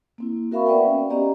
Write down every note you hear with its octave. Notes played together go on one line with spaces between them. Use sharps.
A#3 C4 E4
F#4 A#4 E5 F5 B5 C#6
B3 B4 D5 E5 F#5 G5
C#4
B3 C#4 G4 D5 D#5 A#5